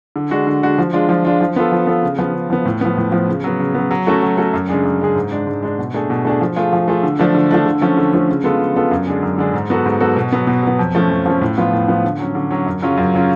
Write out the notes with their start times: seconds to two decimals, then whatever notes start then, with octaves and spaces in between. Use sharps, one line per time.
0.16 D3
0.31 G#3 D4 F#4
0.47 D3
0.62 G#3 D4 F#4
0.78 F3
0.93 G#3 D4 F4
1.09 F3
1.25 G#3 D4 F4
1.41 F3
1.56 B3 F4 A4
1.72 F3
1.87 B3 F4 A4
2.03 C#3
2.18 F3 B3
2.34 C#3
2.50 F3 B3
2.65 A2
2.81 F3 B3
2.97 A2
3.12 F3 B3
3.28 C#3
3.44 F#3 B3
3.60 C#3
3.75 F#3 B3
3.91 F#3
4.07 A3 C#4 F#4 A4
4.22 F#3
4.37 A3 C#4 F#4 A4
4.53 F#2
4.69 C#3 G#3 D4 G#4
4.85 F#2
5.01 C#3 G#3 D4 G#4
5.16 G#2
5.32 G#3 D4
5.47 G#2
5.63 G#3 D4
5.79 B2
5.94 A3 D4 G#4
6.10 B2
6.25 A3 D4 G#4
6.41 F3
6.56 A3 F4 G#4
6.73 F3
6.88 A3 F4 G#4
7.03 D3
7.19 F3 A3 D4
7.35 D3
7.51 F3 A3 D4
7.66 D3
7.81 F3 A3 C#4
7.97 D3
8.13 F3 A3 C#4
8.29 C#3
8.44 G#3 B3 F4 A4
8.60 C#3
8.75 G#3 B3 F4 A4
8.91 F#2
9.07 D3 G#3 D4 G#4
9.22 F#2
9.38 D3 G#3 D4 G#4
9.54 G#2
9.70 F#3 B3 F#4 A4
9.86 G#2
10.00 F#3 B3 F#4 A4
10.16 B2
10.32 F#3 B3
10.47 B2
10.63 F#3 B3
10.79 F2
10.95 F3 A3 C#4
11.10 F2
11.26 F3 A3 C#4
11.41 A2
11.57 F3 B3 F4
11.73 A2
11.88 F3 B3 F4
12.04 D3
12.19 F#3 C#4
12.35 D3
12.51 F#3 C#4
12.66 F#2
12.82 C#3 F#3 C#4 F4
12.97 F#2
13.14 C#3 F#3 C#4 F4